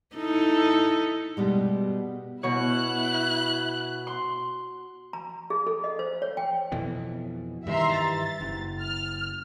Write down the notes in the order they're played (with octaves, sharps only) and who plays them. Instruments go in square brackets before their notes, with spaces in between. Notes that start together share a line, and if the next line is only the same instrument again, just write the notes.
[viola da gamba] D#4 E4 A4
[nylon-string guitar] B2 G3 G#3
[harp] B2 C#5 [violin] E4 F#6
[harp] C6
[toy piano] A#5
G#4
A4
D#5
C5
C#5
G5
[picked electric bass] F2 B2 E3
[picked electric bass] G2 D#3 E3 [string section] E5 A#5 C6
[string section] A6
[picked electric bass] F#1
[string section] F6